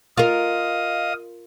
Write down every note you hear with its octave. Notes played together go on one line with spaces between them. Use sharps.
F4 A#4 D#5 F5 D#6